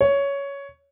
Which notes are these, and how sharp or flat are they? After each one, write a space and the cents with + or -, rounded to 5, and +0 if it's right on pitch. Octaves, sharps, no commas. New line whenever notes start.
C#5 +10